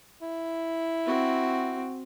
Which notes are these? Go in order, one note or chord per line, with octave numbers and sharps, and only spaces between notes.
E4
C4 F#4